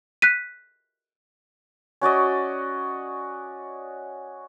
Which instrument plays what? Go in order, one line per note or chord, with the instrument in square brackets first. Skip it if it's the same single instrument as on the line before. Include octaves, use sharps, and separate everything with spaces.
[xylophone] F#6 B6 D#7
[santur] C#4 F#4 D5 D#5